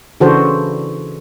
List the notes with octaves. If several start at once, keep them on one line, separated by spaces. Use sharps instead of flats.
C#3 E3 D4 F#4 A4 C5